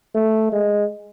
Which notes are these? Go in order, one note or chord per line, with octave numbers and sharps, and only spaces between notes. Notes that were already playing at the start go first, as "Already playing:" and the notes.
A3
G#3